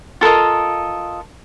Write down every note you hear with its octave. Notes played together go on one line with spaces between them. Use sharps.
F4 A4 A#4 D#5